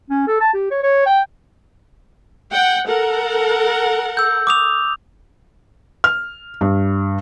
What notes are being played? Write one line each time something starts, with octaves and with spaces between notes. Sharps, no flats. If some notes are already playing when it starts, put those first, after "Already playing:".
C#4
A4
A5
G4
C#5
C#5
G5
F#5 G5
A4 A#4 F#5
E6 G6
D6 D#6 F7
F6
G2